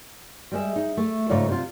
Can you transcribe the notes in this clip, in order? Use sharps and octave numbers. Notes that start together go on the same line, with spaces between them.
G3 G#3 E5
D#4
A3
G#2 C#3 A3 F4 C#5 D5
C3 F4